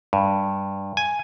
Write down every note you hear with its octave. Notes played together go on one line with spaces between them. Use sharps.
G2
G#5